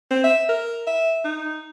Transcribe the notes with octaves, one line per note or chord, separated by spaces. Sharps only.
C4
E5
A#4
E5
D#4